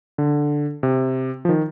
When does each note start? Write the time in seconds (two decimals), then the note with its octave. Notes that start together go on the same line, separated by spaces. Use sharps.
0.18 D3
0.83 C3
1.45 F3
1.49 D#3